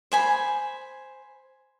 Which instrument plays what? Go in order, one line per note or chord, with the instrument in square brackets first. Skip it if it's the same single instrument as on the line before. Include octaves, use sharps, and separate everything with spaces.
[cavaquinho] C5 G#5 B5